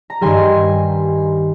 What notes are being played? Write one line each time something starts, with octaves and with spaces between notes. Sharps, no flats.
A#5
G2 D#3 G3 G#5 C6